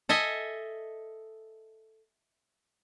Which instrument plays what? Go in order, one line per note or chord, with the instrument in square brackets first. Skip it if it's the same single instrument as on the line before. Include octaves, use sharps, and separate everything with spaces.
[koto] A4 D#5 E5 G#5